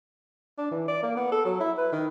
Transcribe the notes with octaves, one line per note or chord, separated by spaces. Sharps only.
D4
E3
D5
A#3
B3
A4
F#3
E4
B4
D#3